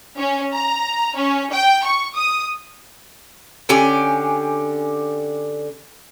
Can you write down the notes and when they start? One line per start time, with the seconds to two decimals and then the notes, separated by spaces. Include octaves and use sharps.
0.18 C#4
0.53 A#5
1.15 C#4
1.52 G5
1.85 C#6
2.16 D#6
3.69 D3 C#4 G4 G#5